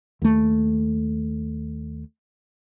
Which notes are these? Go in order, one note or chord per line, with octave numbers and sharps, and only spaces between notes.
D#2 A3